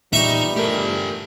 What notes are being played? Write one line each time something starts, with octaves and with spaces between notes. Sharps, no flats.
E2 A#2 F3 G3 D#4 E5 C#6
A3 G4 A4 A#4